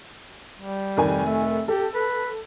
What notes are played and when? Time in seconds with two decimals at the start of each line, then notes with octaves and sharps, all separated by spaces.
0.59 G3
0.97 F1 D#3 G#5
1.25 A3
1.68 G4 A4
1.94 B4